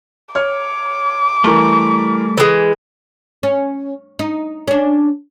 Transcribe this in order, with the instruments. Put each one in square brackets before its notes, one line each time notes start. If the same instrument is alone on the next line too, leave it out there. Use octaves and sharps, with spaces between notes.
[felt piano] C#5 F6 [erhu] D6
[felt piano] E3 A#4 C#6 [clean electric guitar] G3 A3
[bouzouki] E3 G#3
[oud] C#4
D#4
C#4 D4